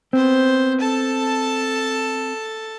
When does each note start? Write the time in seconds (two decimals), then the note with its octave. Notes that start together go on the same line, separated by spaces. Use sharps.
0.13 B3 C4 C5
0.80 A4 A5